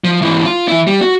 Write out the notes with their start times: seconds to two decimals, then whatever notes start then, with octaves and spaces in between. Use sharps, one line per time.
0.04 F3
0.22 G#2 E3
0.45 F4
0.68 E3 E4
0.87 G3
1.02 F#4